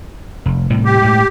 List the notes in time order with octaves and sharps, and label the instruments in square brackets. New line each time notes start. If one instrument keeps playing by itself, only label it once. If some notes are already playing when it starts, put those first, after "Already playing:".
[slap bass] F1
A2 C3 G3
[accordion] G4
[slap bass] A2 G#3